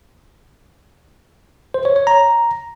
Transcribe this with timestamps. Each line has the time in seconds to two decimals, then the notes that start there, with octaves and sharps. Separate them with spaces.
1.74 C5
1.85 C#5
1.96 C#5
2.07 A#5